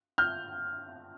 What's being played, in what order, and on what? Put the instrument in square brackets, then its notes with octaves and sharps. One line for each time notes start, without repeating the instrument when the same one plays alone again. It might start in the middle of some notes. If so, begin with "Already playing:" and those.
[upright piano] F6 G6